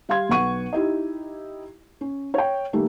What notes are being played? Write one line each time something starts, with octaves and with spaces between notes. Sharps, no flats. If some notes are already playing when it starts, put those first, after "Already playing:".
G3 F5 C6 G#6
B1 B3 F#5 C#6 D#7
D#4 E4 G4 D#5
C#4
C#5 G5
D#3 G3 A3 A#3